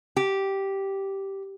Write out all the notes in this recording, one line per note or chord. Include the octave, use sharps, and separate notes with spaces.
G4